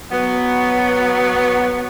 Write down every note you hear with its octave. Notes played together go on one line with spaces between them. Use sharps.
F#3 B3